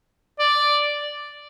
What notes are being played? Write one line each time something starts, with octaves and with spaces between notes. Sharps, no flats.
D5